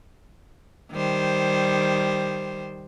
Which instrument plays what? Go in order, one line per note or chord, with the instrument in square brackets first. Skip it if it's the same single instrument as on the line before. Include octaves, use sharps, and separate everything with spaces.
[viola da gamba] D#3 G3 C5